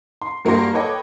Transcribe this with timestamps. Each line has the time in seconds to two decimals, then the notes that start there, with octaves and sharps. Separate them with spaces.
0.22 C6
0.45 G2 A#3 F#4 G4 C6 A#6
0.73 A4 B4 C#5 D#5 G5 D6